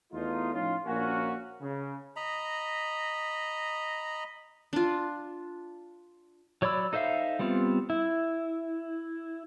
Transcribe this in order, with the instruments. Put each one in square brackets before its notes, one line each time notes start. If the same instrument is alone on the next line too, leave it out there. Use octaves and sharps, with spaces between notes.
[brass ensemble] E2 A3 D#4 F4
A2 F3 C#4 D#4 F4
A#1 A#3 C#4 F#4
C#3
[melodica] D#5 A#5 B5
[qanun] D4 F4
[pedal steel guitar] F#3 C#5 D5 B5 E6
D#4 A4 C5 E5 F5
G3 B3 C4 F4
E4